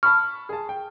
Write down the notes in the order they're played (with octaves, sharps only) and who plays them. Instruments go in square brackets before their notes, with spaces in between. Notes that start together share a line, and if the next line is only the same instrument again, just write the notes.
[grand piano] A5 B5 C#6 [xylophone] F6
[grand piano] G#4 A5
G5